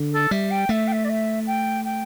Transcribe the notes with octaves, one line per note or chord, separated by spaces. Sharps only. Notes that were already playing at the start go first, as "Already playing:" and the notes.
Already playing: D3
A4
G3 E5
G5
A3 E5
G5
E5
D5
E5
G5
G5